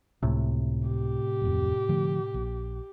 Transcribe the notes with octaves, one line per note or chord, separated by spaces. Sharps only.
C#2 A2 C3
G4
D1 F2
D3 F3 A3
A#1